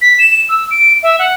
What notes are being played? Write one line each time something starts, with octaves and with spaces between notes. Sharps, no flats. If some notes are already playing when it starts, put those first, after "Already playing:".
B6
E7
E6
D7
E5
F#5